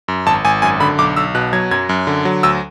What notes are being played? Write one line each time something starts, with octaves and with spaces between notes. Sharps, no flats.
F#2
G#1 A5
G#1 G#5
F#2 G#5
D3 B5
B1 D6
B1 E6
B2 F#6
F#3 G#6
F#2 G#6
F#2
D3
F#3
D2 E6